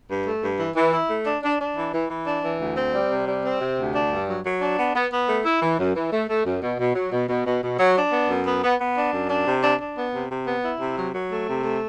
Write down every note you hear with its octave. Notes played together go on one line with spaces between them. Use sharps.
G2
A3
G2
E3
E3
E4
A3
D4
D4
D4
E3
E3
E3
D4
E3
D2
C4
G3
C3
G3
C4
C3
D2
D4
G2
F#3
F#3
D4
B3
B3
B3
A3
E4
E3
F#2
E3
A3
A3
F#2
B2
B2
F#3
B2
B2
B2
B2
F#3
D4
B3
F#2
B3
B3
B3
D4
F#2
D4
C3
D4
D4
B3
C3
C3
B3
E4
C3
F#3
F#3
A3
C3
A3